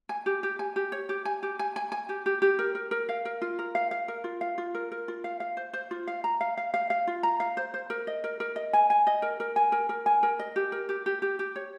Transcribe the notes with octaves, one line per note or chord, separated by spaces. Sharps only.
G#5
G4
G4
G#5
G4
C#5
G4
G#5
G4
G#5
G#5
G#5
G4
G4
G4
A#4
A#4
A#4
F5
A#4
F4
A#4
F5
F5
A#4
F4
F5
F4
A#4
A#4
F4
F5
F5
C5
C5
F4
F5
A#5
F5
F5
F5
F5
F4
A#5
F5
C5
C5
A#4
D#5
A#4
A#4
D#5
G#5
G#5
D#5
A#4
A#4
G#5
A#4
A#4
G#5
A#4
D#5
G4
A#4
G4
G4
G4
G4
C#5